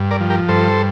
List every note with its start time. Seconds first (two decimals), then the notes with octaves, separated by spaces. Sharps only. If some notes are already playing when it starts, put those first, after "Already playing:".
Already playing: G2
0.11 A#4 D5
0.21 F3
0.30 G4 A#4
0.48 G2 A4 C5